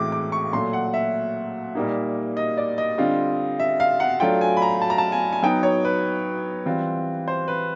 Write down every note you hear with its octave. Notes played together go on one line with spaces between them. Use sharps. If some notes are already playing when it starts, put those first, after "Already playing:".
Already playing: A2 E3 G#3 C4 E4 D6
D6
C#6
A#2 F#3 A3 C6
F#5
E5
A#2 G3 A#3 D#4
D#5
D5
D#5
D3 G3 C4 F4
E5
F5
F#5
F#3 A3 D4 F4 G5
G#5
B5
A#5
A5
A#5
A5
G#5
G#5
F#3 B3 D#4 G5
C#5
B4
E3 G3 C4 F4
C5
B4